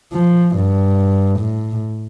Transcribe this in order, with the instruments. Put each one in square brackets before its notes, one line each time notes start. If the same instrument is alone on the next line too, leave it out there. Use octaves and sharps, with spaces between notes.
[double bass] F3
G2
A2